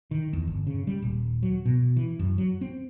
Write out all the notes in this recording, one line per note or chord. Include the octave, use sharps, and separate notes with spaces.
D#3
E2
G1
C#3
G3
D#1
F#3
B2
E3
F#2
F#3
C4